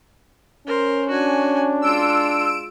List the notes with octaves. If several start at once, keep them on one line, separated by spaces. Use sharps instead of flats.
C#4 A#4 C5
D4 F#4 G#5
G#3 F4 E6 D7